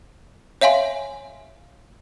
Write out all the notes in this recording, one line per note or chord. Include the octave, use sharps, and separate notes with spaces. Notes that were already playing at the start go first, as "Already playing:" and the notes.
C#5 E5 F5 G#5 C6